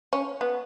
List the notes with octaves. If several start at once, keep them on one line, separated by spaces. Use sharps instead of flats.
C#4
B3